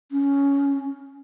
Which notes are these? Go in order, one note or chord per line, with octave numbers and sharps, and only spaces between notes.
C#4